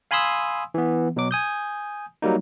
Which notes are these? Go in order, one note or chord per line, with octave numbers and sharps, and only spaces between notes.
F5 G#5 B5 C6 D#6 E6
E3 B3
B2 F#3 D6
G#5 D#6 G6
F#3 G3 A#3 D#4